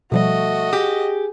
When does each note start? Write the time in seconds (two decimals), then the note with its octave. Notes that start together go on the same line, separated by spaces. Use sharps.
0.12 B2 F3 G3 A3 F#4 D#5
0.73 G4 G#4 D6